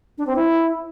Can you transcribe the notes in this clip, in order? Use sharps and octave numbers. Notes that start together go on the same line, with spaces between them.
D4
C4
E4